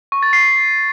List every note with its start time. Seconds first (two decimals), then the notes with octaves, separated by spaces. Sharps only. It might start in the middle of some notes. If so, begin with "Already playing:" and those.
0.12 C#6
0.23 A6
0.33 C7